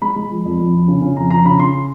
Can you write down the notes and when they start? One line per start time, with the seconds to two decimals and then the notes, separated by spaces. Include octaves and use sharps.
0.01 G#3 B5
0.16 G#3
0.31 F3
0.45 F2
0.60 F2
0.74 F3
0.88 C#3
1.02 C#3
1.16 F2 A#5
1.30 F3 A#5
1.45 C#3 B5
1.59 C#3 C6